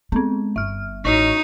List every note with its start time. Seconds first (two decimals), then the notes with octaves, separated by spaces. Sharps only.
0.12 G#3 B3 C4
0.56 G1 E5 F6
1.05 A1 D#4 F#4 C#5 C#6